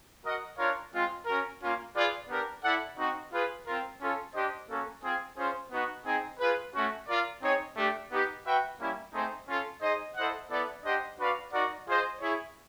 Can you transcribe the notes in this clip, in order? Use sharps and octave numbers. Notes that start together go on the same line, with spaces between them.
F#4 A#4 D#5 F#5
D4 F4 A#4 C#5 F5
G#3 C4 F4
C#4 F#4 A#4
A#3 C#4 F4
F4 G#4 B4 D5
B3 D4 G4 A#4
E4 A4 D5 F#5
C4 D#4 F#4
F4 G#4 B4
C4 F4 A#4
C#4 F4 A4
D4 G4 C5 D#5
A#3 C#4 F#4 A4
C4 F4 G#4
C#4 F4 G#4 C5
B3 D#4 F#4
C4 D#4 G#4
F4 G#4 B4
A3 C#4 F#4
F4 A#4 D5
C4 D#4 G#4 C#5
A3 D4 G4
B3 D#4 G4
F#4 B4 E5 G5
G3 A#3 C#4 E4
A3 C4 D#4 G#4 C5
C#4 F4 A4
D#4 G#4 C5 D#5
E4 A4 C5 D#5 F#5
B3 E4 A4 D5
D4 G4 C5 D#5 F#5
D4 F#4 B4 D5 F5
D#4 F#4 A#4 D5 F#5
F4 G#4 C5 D#5
E4 G#4 C#5